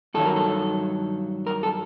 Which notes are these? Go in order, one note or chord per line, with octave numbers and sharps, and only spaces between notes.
G2 D#3 F#3 A4
A#4
A4
A#4
A4